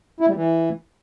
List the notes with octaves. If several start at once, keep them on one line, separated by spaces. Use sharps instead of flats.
E4
G3
E3